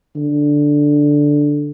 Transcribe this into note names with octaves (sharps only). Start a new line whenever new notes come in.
D3